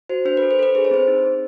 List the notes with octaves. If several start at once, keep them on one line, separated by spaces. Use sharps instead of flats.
F#4 C5
D4 C5
B4
A4
C5
A4 B4
G#4 C5
C#5
C4 C5
D#4
C4